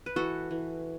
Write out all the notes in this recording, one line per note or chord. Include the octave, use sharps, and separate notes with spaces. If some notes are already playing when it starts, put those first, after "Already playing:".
B4
E3 F#4 A4
E3